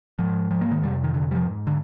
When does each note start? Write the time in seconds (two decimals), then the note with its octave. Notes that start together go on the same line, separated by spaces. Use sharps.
0.19 G#2 F3
0.51 F3
0.61 A#3
0.71 D#3
0.83 F2 C3 G3
1.04 D#3
1.14 D3
1.31 G3
1.35 F3
1.46 G#2
1.67 D3